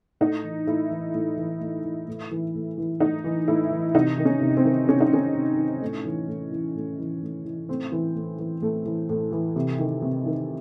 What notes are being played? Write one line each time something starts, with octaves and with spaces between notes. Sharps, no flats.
A2 D#4
E3
A2 E4
E3
A2
E3
A2
E3
A2
E3
A2
E3
A2 D#4
E3
A2 E4
E3
C3 D#4
D#3
C#4
C3
C4
D#3
C3 C#4
D#4
D#3 C#4
C3
D#3
A2
E3
A2
E3
A2
E3
A2
E3
A2 C4
E3
A2
E3
A2 A3
E3
A2
E3
C3
D#3
C3
D#3